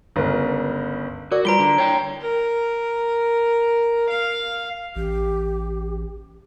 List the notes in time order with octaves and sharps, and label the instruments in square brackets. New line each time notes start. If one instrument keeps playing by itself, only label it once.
[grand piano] G1 C#2 A#4
[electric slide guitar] F#4 [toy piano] A#4 D5 D6
[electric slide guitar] G3 [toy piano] F4 F#4 B4 [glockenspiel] A#5 D7 G7
[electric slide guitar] D3
C#5 G5
[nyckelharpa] A#4
F5
[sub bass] A1 [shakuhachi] G4